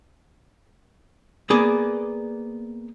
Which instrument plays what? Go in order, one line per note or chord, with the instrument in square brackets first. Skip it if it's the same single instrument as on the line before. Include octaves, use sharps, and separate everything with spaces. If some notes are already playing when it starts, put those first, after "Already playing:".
[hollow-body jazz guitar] A#3 B3 G#4 D5